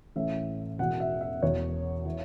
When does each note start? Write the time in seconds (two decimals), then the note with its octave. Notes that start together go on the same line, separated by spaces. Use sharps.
0.16 A1 A2 E3 E5
0.79 E1 E2 B2 F#5
1.00 E5
1.21 E5
1.42 E1 E2 B2 C#5
2.06 E3